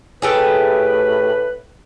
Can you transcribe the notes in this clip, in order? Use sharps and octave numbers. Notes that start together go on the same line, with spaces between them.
A2 A3 G4 G#4 B4